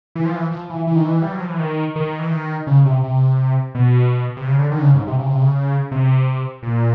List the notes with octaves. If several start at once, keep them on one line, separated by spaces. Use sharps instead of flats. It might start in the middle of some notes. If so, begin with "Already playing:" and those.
E3
F3
E3
F3
E3
E3
D#3
E3
G3
F#3
F3
E3
D#3
D#3
E3
D#3
C#3
C3
C3
B2
C3
C#3
D3
D#3
D3
C#3
G#2
C3
C#3
C3
C#3
C3
A#2